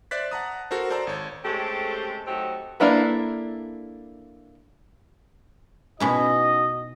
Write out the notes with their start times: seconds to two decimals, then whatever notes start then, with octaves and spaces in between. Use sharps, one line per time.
0.11 C5 D5 E5 F#6 A6 B6
0.31 F#5 A5 A#5 D#6
0.71 F#4 A4 A#4 C5
0.90 F#4 C5 D5 A5 A#5 E6
1.07 G#1 C#5
1.45 G#3 A3 C4 C#4 G4 A4
2.27 F#3 A3 C4 D#4 F#4 G4
2.80 A#3 D4 E4 A4 B4
6.00 B2 C#4 D#4 E4 F#4 D#5